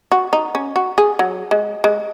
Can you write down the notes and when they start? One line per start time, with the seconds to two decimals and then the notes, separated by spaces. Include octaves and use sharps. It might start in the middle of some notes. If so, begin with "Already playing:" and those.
0.12 F#4
0.33 D#4
0.55 C#4
0.76 F#4
0.98 G#4
1.19 F#3
1.51 G#3
1.84 G#3